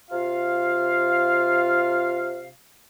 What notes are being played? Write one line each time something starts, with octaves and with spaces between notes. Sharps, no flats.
C3 F4 F5